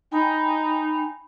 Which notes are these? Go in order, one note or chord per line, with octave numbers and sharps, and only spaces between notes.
D#4 G5 G#5 B5